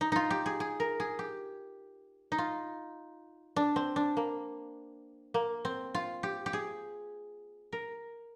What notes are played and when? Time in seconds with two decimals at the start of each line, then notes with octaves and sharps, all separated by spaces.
0.01 D#4
0.12 D#4 F4
0.31 G4
0.46 G#4
0.60 G#4
0.80 A#4
1.00 G#4
1.19 G4
2.32 D#4
2.38 F4
3.56 D4
3.76 C4
3.96 D4
4.17 A#3
5.34 A#3
5.65 C4
5.95 F4
6.23 G4
6.46 G4
6.53 G#4
7.73 A#4